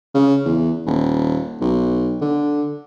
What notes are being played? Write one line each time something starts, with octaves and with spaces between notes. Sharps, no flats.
C#3
E2
D#1
B1
D3